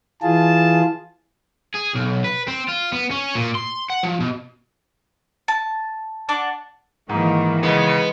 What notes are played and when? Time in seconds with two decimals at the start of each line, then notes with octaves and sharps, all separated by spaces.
0.22 E3 F4 G#4 A5
1.74 G#4
1.95 B1
2.24 B4
2.48 C4
2.69 F4
2.93 B3
3.11 C#4
3.35 A#2
3.55 C6
3.90 F#5
4.04 F3
4.21 B2
5.48 A5
6.29 D4 F#5 D6
7.09 G#2 D#3 E3 A#3
7.63 C#3 G#3 B3